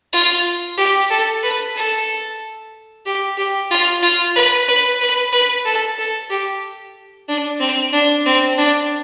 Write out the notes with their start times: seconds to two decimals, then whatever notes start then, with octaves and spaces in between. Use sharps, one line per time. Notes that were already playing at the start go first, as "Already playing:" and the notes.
0.13 F4
0.77 G4
1.10 A4
1.43 B4
1.76 A4
3.06 G4
3.37 G4
3.70 F4
4.03 F4
4.35 B4
4.68 B4
5.01 B4
5.32 B4
5.65 A4
5.98 A4
6.30 G4
7.28 D4
7.60 C4
7.93 D4
8.26 C4
8.58 D4